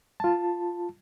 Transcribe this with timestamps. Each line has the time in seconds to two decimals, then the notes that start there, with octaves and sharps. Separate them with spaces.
0.20 F4 A5